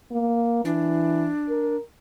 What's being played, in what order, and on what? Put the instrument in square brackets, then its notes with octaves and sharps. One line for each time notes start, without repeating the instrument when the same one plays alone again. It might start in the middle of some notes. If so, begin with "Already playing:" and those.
[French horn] A#3
[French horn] E3 [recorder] D4
[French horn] A#4